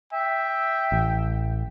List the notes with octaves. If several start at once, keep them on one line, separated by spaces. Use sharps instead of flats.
E5 G5
A1